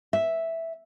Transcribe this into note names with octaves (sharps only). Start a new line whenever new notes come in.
E5